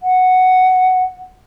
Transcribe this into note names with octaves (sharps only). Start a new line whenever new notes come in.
F#5